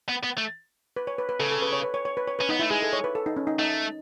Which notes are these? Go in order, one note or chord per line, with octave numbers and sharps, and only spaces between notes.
B3
B3
A3
B4
C#5
B4
B4
C#3 A4
A4
B4
C#5
B4
C#5
C#5
B4
C#5
C#4 B4
B3 D#4
A3 E4
G#3 G#4
A4
C#5
B4
A4
D#4
C#4
D#4
A3 D#4